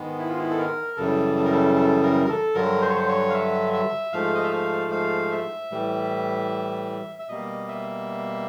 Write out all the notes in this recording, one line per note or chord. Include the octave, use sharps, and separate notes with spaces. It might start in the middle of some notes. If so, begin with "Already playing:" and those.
Already playing: G#2 D#3 G#3 B3
E4
F4
E4
A4
A#4
F#2 C#3 E3 G3 A4
A4
A#4
A4
A4
A#4
A#4
A4
G2 D3 F#3 A#4
C5
C#5
C5
C#5
F5
E5
E5
G#2 F3 A3 F5
D#5
E5
F5
F5
E5
A2 E3 G3
E5
B2 G3 A#3 D#5
E5